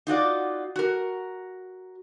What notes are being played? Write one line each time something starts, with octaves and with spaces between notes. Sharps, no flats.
D#4 F4 F#4 D5
F#4 A#4